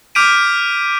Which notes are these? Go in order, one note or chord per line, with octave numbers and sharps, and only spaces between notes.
D6 F6 G6 B6 D7 D#7